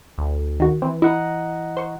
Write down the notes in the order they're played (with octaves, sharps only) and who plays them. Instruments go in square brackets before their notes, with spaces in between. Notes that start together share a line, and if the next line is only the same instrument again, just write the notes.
[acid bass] D2
[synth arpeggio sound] D#3 F#4
[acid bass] E3 [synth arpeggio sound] C4
[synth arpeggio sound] E4 [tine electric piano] D#5 F#5 A#5
[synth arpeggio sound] C5 C#6